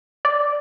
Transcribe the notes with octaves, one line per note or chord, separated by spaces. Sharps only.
D5